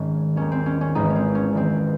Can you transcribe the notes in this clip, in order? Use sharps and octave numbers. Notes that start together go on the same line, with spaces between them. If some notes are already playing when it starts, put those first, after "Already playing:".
Already playing: G#1 G#2 D#3 C#4
D#2 D#3 C#4
C4
C#4
C#4
G#1 G#2 E3 D#4
C#4
C4
C#4
F#1 E2 D#3 C4